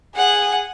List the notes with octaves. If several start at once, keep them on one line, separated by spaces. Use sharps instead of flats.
G#4 F#5